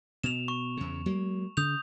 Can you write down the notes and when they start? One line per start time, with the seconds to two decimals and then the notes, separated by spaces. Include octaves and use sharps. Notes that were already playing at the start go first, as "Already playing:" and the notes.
0.24 B2 E7 F7
0.48 C#6
0.77 E2 C#3
1.06 F#3 G#3 A#3
1.57 C#3 D#6 G6 F7